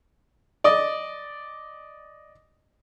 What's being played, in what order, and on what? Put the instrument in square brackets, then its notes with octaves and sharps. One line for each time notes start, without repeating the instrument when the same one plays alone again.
[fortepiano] D5 D#5